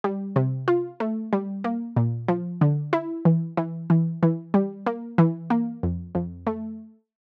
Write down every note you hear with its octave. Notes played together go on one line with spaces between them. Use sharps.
G3
C3
F4
A3
G3
A#3
A#2
F3
D3
E4
E3
E3
E3
E3
G3
A#3
E3
A#3
F2
F2
A3